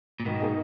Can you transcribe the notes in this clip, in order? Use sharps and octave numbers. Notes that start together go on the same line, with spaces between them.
A#2
G#2 B2 D#3
A#3 D#4 G#4 D#5